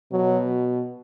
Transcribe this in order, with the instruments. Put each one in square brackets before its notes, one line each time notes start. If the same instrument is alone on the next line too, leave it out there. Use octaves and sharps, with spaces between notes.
[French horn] B2 [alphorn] F#3